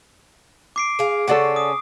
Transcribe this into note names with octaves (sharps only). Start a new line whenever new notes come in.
D6 C7 D7
G#4 F5
C#3 C4 C#4 A4 D5 F#5
D#6